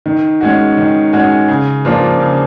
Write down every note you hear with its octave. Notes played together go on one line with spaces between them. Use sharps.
D#3
G#3 C#4 F#4
D#3
G#3 C#4 F#4
C#3
F3 A#3 D4 F4
C#3